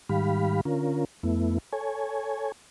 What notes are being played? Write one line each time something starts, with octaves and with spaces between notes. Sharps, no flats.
G#2 D#3 G3 G4 F5 B5
D3 C#4 F4 A#4
F2 A3 B3 E4
A4 C#5 G#5